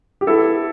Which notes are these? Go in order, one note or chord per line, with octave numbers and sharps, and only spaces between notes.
G4
B3 E4 A4